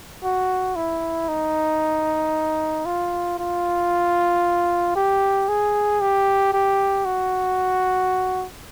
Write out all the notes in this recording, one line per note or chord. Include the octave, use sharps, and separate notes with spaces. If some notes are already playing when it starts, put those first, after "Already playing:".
F#4
E4
D#4
F4
F4
G4
G#4
G4
G4
F#4